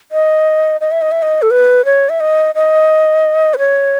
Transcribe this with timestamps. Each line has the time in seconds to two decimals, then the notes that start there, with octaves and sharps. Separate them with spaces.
0.12 D#5
0.81 D#5
0.91 E5
1.02 D#5
1.12 E5
1.22 D#5
1.42 A4
1.51 B4
1.85 C#5
2.09 E5
2.20 D#5
2.55 D#5
3.54 B4
3.59 C#5